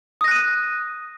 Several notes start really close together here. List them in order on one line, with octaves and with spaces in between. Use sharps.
D#6 A#6 F#6 D#7